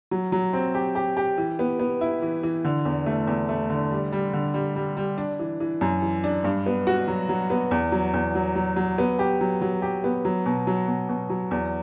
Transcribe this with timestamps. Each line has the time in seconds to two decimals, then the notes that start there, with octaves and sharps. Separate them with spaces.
0.11 F#3
0.32 F#3
0.53 C4
0.75 G4
0.95 G4
1.17 G4
1.38 E3
1.59 B3
1.79 B3
2.01 E4
2.22 E3
2.43 E3
2.64 D3
2.85 E2
3.06 A3
3.27 E2
3.49 A3
3.70 D3
3.91 G3
4.12 G3
4.33 D3
4.54 G3
4.76 G3
4.97 G3
5.18 D4
5.39 E3
5.60 E3
5.81 F#2
6.02 E3
6.24 D4
6.44 G2
6.66 B3
6.87 F#4
7.08 F#3
7.29 F#3
7.50 B3
7.71 E2
7.92 F#3
8.14 E2
8.35 F#3
8.56 F#3
8.76 F#3
8.98 B3
9.19 G4
9.41 F#3
9.62 F#3
9.82 G4
10.04 B3
10.25 F#3
10.46 B2
10.67 F#3
10.88 B2
11.09 B2
11.30 F#3
11.51 E2